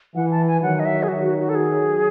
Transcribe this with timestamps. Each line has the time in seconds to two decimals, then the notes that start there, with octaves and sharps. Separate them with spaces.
0.15 E3 F#5
0.31 A5
0.47 G#5
0.62 D#3 F#3 F#5
0.80 D#5
0.85 E5
1.03 G#4
1.08 D#3 F#3 F#4
1.23 F#4
1.39 F#4
1.49 A4
1.55 G#4